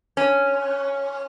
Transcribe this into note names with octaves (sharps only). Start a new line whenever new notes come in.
C#4